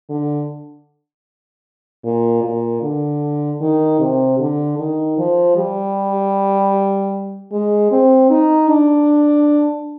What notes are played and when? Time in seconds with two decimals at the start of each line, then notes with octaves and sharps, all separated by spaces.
0.10 D3
2.04 A#2
2.43 A#2
2.82 D3
3.61 D#3
4.00 C3
4.39 D3
4.79 D#3
5.18 F3
5.56 G3
7.52 G#3
7.91 C4
8.30 D#4
8.69 D4